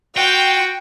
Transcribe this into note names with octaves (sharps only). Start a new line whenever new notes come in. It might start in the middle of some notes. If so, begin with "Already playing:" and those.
F4 F#4 G5